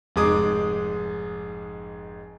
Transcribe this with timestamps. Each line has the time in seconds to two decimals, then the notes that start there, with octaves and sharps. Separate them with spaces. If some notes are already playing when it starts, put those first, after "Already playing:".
0.16 F1 G#2 G#3 D6 D#6